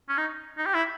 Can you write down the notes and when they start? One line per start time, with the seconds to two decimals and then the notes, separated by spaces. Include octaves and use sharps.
0.09 C#4
0.18 D#4
0.58 D#4
0.66 G4
0.74 E4